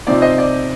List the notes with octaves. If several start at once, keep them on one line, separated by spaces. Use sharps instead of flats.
C3 F3 C4 D#4 D5
C5 D#5
D5